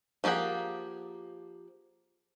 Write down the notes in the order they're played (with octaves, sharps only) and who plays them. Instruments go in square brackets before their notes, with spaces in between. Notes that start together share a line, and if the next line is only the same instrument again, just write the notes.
[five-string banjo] F3 A#3 G4 G#4 F#5